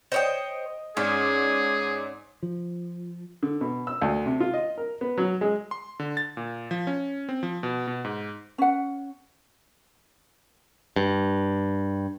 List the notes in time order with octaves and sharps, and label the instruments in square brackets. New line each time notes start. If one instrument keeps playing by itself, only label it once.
[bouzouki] C5 C#5 G5 [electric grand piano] D#5 D#6
[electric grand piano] G#2 D5 [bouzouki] C#4 [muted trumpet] G#4
[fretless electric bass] F3
[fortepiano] D3
B2
E6
D2
C3
F4
D#5
A#4
B3
F#3
G#3
[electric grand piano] C6
D3
A6
A#2
F3
C#4
C4
F3
B2
B2
G#2
[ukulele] C#4 F#5
[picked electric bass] G2